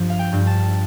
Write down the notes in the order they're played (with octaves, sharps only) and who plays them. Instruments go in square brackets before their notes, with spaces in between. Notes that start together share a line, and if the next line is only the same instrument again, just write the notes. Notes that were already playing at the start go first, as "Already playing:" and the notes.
Already playing: [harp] G2 F3
F5
G5
G2
A5